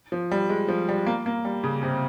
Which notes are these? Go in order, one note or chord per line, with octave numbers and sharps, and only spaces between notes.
F3
G3
G#3
F3
G3
A#3
A#3
G3
C#3
C3